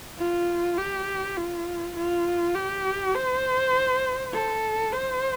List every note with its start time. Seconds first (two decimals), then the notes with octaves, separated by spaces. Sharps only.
0.18 F4
0.78 G4
1.37 F4
1.96 F4
2.55 G4
3.14 C5
4.33 A4
4.93 C5